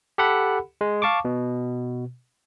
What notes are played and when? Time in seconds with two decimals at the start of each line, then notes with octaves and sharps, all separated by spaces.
0.18 G4 A4 F#5 B5
0.81 G#3
1.02 F5 A5 C#6 D6
1.25 B2